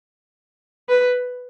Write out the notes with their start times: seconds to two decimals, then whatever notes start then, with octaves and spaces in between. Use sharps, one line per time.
0.89 B4